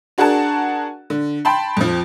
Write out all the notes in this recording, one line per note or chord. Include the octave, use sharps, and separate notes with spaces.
D4 F#4 G#4 A#4 F#5 A5
D3
G5 A5 B5 C6
F2 F3